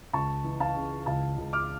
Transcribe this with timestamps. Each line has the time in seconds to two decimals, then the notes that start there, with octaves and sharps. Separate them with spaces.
0.13 C#2 A5 C#6
0.44 E3
0.60 F5 A5
0.76 C#3
1.06 C#2 F5 A5
1.38 C#2
1.53 D6 F6